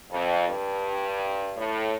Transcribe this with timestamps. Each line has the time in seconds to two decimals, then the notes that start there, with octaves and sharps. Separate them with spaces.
0.10 F2
0.47 G2
1.57 A2